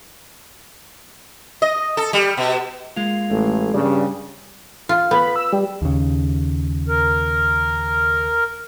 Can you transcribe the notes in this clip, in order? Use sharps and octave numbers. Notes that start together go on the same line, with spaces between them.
D#5
A4
G3
B2
G#3 A#3 F4
A1 A3
G2 C#3 G3
F4
B3 B5
E6
G3
D#2 C#3
A#4